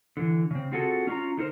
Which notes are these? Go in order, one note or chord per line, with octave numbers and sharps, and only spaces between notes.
D3 E3
C#3 C4
C4 F4 F#4 G#4 A4
C#4 D4 F4 A#5
D3 D#4 A#4 C5